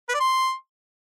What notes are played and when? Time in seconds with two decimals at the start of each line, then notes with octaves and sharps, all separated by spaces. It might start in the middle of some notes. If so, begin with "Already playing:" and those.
0.09 B4
0.14 D5
0.20 C6